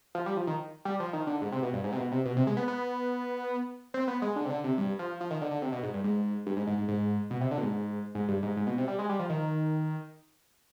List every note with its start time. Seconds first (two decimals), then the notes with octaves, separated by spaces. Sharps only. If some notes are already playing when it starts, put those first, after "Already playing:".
0.15 F3
0.26 G3
0.37 F3
0.47 D#3
0.85 G3
1.00 F3
1.13 D#3
1.27 D3
1.41 G#2
1.52 C3
1.63 B2
1.73 G2
1.84 G#2
1.92 C3
1.97 B2
2.12 C3
2.26 B2
2.36 C3
2.47 G#3
2.57 B3
2.68 B3
3.94 C4
4.08 B3
4.22 G#3
4.36 D3
4.45 C3
4.50 D3
4.64 C3
4.78 G2
4.99 F3
5.20 F3
5.31 D#3
5.41 D3
5.51 D3
5.62 C3
5.72 B2
5.83 G#2
5.94 G2
6.04 G#2
6.46 G2
6.57 G#2
6.67 G#2
6.78 G#2
6.88 G#2
7.30 B2
7.41 C3
7.51 D3
7.58 B2
7.62 G#2
8.15 G#2
8.28 G2
8.43 G#2
8.57 G#2
8.67 B2
8.78 C3
8.88 G3
8.99 G#3
9.09 G3
9.19 F3
9.30 D#3